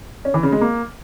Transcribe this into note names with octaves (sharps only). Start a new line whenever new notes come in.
C#4
E3
C#3
G#3
A#3